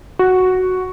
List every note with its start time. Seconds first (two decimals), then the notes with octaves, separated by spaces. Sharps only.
0.19 F#4